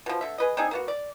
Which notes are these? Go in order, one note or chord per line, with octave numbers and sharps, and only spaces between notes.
B2 F3
D3 E5
G#4 B4 D#5
C4 D4 D#4 G#4
A#3 B3 F#4
D5